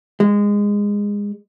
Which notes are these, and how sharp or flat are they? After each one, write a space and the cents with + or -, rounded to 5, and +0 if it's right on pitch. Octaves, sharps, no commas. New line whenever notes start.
G#3 -20